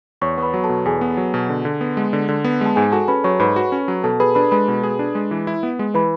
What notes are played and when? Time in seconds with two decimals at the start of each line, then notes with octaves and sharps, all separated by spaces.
0.21 E2 C#5 C#6
0.38 B3 C#6
0.43 B4 B5
0.54 F#3
0.64 A4 A5
0.69 B2
0.85 E2 G#4 G#5
1.01 B3
1.17 F#3
1.34 B2
1.49 D3
1.65 D3
1.81 B3
1.97 G#3
2.13 D3
2.29 D3
2.44 B3
2.61 G#3 A5
2.76 G#2 G#4 G#5
2.92 F#4 A4 A5
3.08 C#4 B4 B5
3.24 F#3 C#5 C#6
3.40 G#2 B4 B5
3.56 F#4
3.72 C#4
3.88 F#3
4.04 B2 A4 A5
4.20 G#4 B4 B5
4.35 D4 B4 B5
4.51 G#3 B4 B5
4.68 B2
4.83 G#4
4.99 D4
5.15 G#3
5.31 E3
5.47 E4
5.63 B3
5.79 G#3
5.94 E3 B4 B5